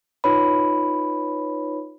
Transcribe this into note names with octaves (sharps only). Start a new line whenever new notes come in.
D#4 F4 B4 C#5 B5